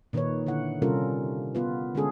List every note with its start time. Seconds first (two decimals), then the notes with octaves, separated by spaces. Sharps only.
0.13 A#2 D#3 D#4 B4 C#5
0.46 D3 E4 F#5
0.82 C3 G3 C#4 F4 A4 A#4
1.55 B3 F4 B4
1.95 D3 G#3 C#4 G#4 A4